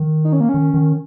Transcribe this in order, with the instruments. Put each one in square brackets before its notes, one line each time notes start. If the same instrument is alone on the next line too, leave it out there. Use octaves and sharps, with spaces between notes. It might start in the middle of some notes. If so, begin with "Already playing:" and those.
Already playing: [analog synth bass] D#3
[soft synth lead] D#4
C#4
A#3
C#4
[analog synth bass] D#3
D#3